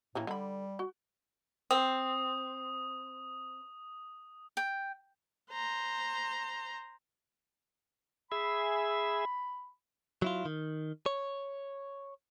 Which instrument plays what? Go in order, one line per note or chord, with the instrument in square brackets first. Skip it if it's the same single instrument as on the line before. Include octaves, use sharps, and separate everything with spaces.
[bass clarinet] A2 [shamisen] E3 A#3 C#4
[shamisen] D3 B5 [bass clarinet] G3
[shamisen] F#4
[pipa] C4 [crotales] D#6
[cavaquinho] G5
[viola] C5 A#5
[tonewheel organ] G#4 E5 [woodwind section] B5
[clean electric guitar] F#3 E4 F4
D#3
C#5